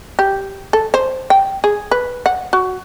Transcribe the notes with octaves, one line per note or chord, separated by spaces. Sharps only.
G4
A4
C5
G5
G#4
B4
F#5
F#4